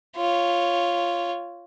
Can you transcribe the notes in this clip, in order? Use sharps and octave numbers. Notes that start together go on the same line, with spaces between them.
F4 C#5